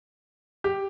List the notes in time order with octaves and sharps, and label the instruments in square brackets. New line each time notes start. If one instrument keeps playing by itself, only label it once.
[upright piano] G4